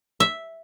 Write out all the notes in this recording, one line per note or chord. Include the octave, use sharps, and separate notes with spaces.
E5